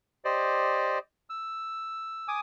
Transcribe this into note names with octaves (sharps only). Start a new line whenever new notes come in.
G4 C5 D5 D#5
E6
G#5 D6 D#6